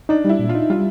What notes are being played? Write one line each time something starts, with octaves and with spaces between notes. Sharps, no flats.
D4 D#4
G3 E4
A#2
F4
D#4
G3 F4